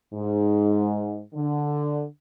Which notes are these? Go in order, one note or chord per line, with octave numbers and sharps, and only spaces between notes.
G#2
D3